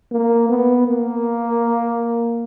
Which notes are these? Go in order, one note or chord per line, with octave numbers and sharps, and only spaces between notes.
A#3
B3
A#3